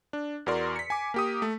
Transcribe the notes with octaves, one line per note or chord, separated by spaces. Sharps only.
D4
E2 F#4 A#4 D5 C6
B6 C#7
G#5 D6
A#3 G4 D#6
A3